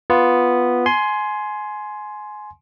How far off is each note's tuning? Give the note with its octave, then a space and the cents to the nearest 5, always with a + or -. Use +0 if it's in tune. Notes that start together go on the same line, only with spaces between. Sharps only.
B3 +0 F4 +0
G#5 +20 C6 +0